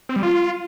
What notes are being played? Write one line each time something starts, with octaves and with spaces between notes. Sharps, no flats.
C4
G3
F4